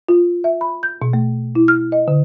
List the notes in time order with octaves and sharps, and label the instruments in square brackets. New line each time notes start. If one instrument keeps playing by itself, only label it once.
[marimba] F4
E5
B5
G6
B2
A3
E4
F6
D#5
D3